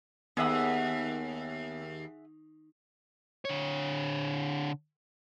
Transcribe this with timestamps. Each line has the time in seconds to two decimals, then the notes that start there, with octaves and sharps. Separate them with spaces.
0.37 D#2 B3 G#4 E5 F#5
3.45 D3 C#5